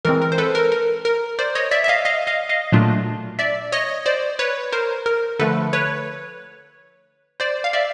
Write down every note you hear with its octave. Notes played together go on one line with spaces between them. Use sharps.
E3 G#3 C4 A#4
A#4
C5
A4 B4
A#4
A#4
A#4
C5 D5
C#5 D#5
D5 E5
E5
D#5 F5
D#5 F5
D#5 F5
D#5 F5
A#2 F#3 A3 D4 F4
D5 E5
C#5 D#5
C5 D5
B4 C#5
A#4 C5
A#4
D3 F3 A3 A4 B4
B4 C#5
C5 D5
F5
D5 E5